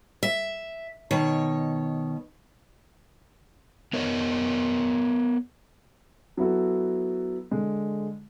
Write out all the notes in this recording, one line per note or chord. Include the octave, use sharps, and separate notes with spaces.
E5
B2 D#3 C#5
B3 A#4 C#5 D#5
F#3 B3 E4 F#4 A4
D3 G#3